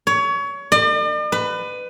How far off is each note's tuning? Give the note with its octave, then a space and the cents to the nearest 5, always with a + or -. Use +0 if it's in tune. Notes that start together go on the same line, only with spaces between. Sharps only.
C#5 +25
D5 +45
B4 +20